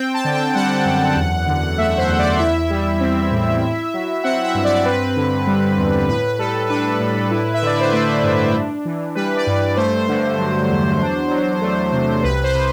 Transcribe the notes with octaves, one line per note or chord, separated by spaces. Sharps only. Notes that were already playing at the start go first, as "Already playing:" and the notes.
Already playing: C4 G5
A5
D3
G5
G3 F#5
F#2
E2
D3
A3 E5
C5
E2
D5
E4 E5
G3
C4
A2
E4
F#3
C4 F#5
E5
G2
D5
C4 B4
D3
G3
E2
A2 B4
B4
G3 A4
D4 B4
A2
E4
E5
D3 D5
C5
A3 B4
G2
D4
E3
G3 B4
D5
G2
A3 C5
D3
F#3
E2
D4
F#3
A3
C3
C2 B4
C5
C3